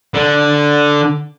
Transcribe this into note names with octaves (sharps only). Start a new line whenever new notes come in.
D3